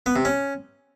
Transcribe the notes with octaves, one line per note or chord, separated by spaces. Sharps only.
B3
C3
C#4